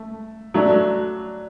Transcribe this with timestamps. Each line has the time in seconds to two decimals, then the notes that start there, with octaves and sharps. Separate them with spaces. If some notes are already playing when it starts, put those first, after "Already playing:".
Already playing: A3
0.54 F#3 A3 D4